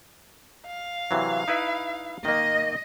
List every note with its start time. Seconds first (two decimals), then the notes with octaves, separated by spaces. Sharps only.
0.67 F5
1.11 C3 E3 F#3
1.48 D#4 E4 B4
2.25 D#3 A#3 D#5